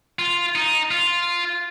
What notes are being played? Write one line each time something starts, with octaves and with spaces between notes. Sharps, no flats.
F4
D#4
F4